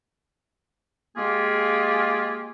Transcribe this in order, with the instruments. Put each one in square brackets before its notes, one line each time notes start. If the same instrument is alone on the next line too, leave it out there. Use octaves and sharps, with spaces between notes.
[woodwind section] G#3 A#3 F4 G4 G#4